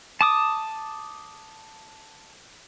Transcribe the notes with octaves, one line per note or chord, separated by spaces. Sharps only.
A5 D6 D#6